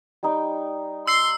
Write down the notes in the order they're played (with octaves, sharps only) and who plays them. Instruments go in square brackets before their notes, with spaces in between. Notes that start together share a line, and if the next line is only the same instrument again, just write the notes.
[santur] G3 D#4 G5
[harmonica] C6 [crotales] E6 C7